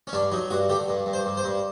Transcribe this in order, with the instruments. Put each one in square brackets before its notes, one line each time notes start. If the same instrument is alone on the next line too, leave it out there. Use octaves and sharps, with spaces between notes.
[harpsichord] C#4
G2 D4
F#3 D#4
G2 F#4
D3 G4
G2
G2
C5
G2
C5
G2